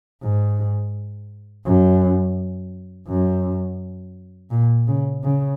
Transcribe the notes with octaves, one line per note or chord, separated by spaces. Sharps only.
G#2
F#2
F#2
A#2
C#3
C#3